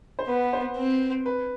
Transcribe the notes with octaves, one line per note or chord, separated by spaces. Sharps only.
C5
B3 B4
C5
C4
B4